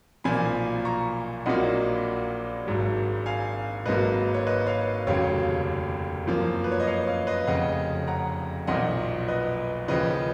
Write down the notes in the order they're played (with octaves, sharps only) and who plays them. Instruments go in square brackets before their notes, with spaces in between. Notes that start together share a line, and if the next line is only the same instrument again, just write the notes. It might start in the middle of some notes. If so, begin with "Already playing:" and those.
[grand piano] B1 A#2 F3 A#3 G#5 B5
A#5 C#6
A#1 A#2 F#3 A#3 D#5 F#5
G#1 G#2 F#3
F5 G#5
G#1 G#2 F#3 A#3 B4 D#5
C#5
B4 D#5
C#5 F5
F1 D#2 C#3 F#3 C#5 F5
F#2 F3 A#3
B4
C#5
D#5
C#5 F5
C#5 F5
B4 D#5
F1 F2 C#3 D#5 F#5
F#5 A#5
B1 A#2 F3 D#5 F#5
B4 D#5
D#2 C#3 F3 B4 D#5